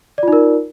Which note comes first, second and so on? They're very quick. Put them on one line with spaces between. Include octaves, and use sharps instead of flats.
D5 F4 D#4 A#4